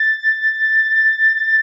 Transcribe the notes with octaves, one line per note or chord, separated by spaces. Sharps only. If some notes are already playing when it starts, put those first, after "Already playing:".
Already playing: A6